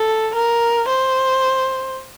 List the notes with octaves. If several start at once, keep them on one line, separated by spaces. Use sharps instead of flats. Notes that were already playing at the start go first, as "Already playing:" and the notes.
Already playing: A4
A#4
C5